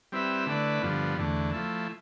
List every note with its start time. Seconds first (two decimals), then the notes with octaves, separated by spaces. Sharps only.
0.12 G3 C4 E4 B4 E5
0.46 D3 A3 E4 B4 D5
0.82 G2 D3 F3 B3
1.17 E2 D3 A3
1.53 F3 A3 E4